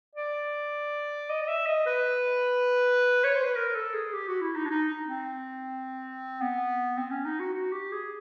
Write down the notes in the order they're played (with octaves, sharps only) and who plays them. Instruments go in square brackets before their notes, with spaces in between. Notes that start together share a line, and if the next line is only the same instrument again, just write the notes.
[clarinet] D5
D#5
D#5
E5
D#5
B4
C#5
C5
B4
A#4
A4
G#4
G4
F#4
E4
D#4
D4
D#4
C4
B3
C4
C#4
D#4
F#4
F#4
G4
G#4